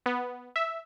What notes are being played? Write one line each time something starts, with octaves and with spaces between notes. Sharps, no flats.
B3
E5